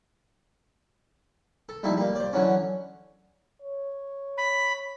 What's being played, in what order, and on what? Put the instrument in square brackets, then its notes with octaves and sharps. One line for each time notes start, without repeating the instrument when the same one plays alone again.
[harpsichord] A4
A#1 G3 A3 D#4 E4
G3 A#3
C5 D5
D3 E3 F#3 C#4
[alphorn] C#5
[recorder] B5